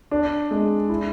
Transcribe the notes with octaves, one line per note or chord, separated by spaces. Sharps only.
D4
G#3
E4